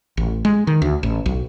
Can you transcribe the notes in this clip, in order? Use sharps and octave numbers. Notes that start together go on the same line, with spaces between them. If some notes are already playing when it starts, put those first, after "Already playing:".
A1
G#3
D#3
D2
A1
B1